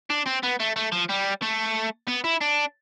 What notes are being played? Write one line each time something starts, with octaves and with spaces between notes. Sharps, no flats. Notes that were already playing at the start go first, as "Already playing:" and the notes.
D4
C4
B3
A3
A3
F3
G3
A3
B3
E4
D4